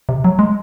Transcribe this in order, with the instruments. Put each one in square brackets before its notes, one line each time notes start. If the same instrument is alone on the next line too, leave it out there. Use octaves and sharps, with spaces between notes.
[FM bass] C3
F#3
G#3